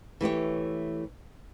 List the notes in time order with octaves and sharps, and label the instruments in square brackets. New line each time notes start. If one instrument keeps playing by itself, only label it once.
[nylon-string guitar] E3 A3 G4 C#5